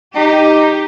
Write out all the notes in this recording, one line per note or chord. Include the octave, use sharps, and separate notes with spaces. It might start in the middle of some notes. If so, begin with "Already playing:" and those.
D#4 G4